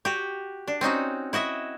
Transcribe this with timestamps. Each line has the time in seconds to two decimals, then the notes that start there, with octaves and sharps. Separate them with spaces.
0.05 F#4 G4
0.68 D4
0.81 C4 C#4 D#4 F#4
1.33 E4 F#4 D#5 E5